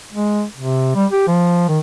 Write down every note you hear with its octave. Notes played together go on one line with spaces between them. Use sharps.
G#3
C3
G3
G4
F3
D#3